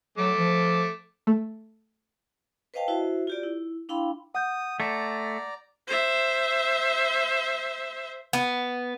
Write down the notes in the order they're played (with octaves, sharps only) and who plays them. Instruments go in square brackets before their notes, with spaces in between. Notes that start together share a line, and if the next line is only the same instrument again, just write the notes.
[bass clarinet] F#3 [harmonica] A3 D6
[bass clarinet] F3
[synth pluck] A3
[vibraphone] B4 C5 D#5 F5 G5 A5
E4 F#4 C5 E5
F4 G4 D5
E4
D4 E4 F5 G5 B5 C6
[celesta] F#5 G6 [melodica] D#6
[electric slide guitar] A3 [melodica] D5 A#5
[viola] C5 E5
[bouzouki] B3